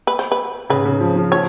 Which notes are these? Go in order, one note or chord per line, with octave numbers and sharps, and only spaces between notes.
B4
C5
B4
C#3 B4
C#3
F3
F3
F3 C#5